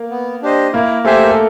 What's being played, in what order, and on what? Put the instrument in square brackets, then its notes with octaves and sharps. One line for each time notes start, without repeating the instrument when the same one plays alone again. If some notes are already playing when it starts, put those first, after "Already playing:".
Already playing: [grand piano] A#3 A#4
[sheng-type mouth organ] B3
D4 G4 C5 D#5
[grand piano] A#3 A#4 [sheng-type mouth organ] E4
[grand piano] A3 A4 [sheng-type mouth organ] G4 C5 E5 G#5
[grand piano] A#4
A4